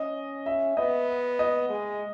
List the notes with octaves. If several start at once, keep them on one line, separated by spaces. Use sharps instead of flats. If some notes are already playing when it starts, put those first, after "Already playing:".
Already playing: C#4 D#5
E5
B3 D#5
D#5
G#3